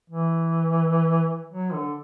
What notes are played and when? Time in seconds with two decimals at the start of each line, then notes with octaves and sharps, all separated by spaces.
0.10 E3
1.53 F#3
1.73 D3